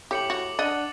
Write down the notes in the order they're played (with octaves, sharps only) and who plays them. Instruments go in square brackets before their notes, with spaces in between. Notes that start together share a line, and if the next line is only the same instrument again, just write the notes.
[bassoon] A2 [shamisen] G4 [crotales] D6 C#7 F#7
[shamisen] F#4
[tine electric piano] D4 F#5 [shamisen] D#5 [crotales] A6